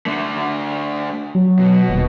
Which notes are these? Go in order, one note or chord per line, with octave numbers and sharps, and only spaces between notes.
A3 D4
F#3
B2
D#1